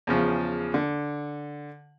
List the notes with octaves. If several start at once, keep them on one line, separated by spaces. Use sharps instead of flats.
E2 C#3 F3
D3